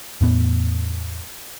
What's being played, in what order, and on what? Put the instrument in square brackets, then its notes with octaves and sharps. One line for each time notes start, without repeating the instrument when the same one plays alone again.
[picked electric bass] E2 A2 B3